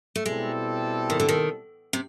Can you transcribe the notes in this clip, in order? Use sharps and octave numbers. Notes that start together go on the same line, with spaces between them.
A3
B2 G3 G#3 C4 E4 A4
D#3
D3
D#3
C3